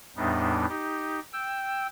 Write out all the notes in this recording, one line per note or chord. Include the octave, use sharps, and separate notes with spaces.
E2 A2 G3 B3 D4 D#4
D#4 G4
G5 E6